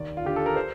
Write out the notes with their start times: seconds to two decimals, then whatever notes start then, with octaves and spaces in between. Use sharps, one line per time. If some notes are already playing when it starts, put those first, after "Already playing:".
Already playing: D#2 D5
0.17 F4
0.24 D3 G4
0.36 A4
0.46 A#4
0.56 C5